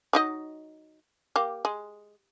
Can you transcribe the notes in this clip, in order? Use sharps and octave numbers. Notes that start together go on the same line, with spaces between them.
F#3 D#4 D#5
A#3 G4
G#3